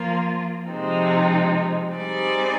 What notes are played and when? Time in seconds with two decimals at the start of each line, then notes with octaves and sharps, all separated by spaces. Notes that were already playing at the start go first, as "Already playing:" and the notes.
Already playing: F3 A#3 F4
0.69 C3 F3 G#3 C4 D#4
1.91 G3 C4 D#4 G#4 D5